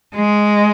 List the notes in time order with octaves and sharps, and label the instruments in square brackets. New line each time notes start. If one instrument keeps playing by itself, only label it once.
[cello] G#3